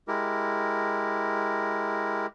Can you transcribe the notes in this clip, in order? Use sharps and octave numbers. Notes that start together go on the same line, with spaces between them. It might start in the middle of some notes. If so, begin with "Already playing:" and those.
G#3 E4 G4 A#4